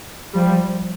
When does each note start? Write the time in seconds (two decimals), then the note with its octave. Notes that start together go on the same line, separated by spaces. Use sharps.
0.33 F3 G3